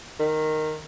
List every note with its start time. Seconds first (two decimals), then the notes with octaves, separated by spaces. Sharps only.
0.19 D#3